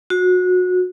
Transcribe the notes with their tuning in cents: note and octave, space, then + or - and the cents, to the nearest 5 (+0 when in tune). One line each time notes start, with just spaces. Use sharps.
F#4 -25